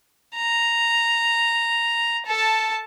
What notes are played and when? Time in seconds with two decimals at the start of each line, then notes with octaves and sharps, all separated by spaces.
0.36 A#5
2.26 A4 A5